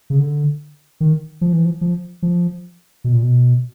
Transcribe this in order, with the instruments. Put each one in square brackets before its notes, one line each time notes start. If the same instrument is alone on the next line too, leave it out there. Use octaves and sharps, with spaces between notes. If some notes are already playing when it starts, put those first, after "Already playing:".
[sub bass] C#3
D3
D#3
F3
E3
F3
F3
F3
B2
A#2
B2